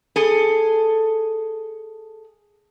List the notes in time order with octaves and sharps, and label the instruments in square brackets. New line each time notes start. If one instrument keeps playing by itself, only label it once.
[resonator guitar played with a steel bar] G#4 A4